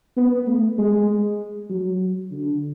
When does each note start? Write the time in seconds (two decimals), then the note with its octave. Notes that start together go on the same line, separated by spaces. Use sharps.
0.17 B3
0.47 A3
0.78 G#3
1.69 F#3
2.31 D3